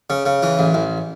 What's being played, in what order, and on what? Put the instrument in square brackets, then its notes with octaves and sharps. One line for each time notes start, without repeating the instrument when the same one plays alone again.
[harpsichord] C#3
C#3
E3
A1
A1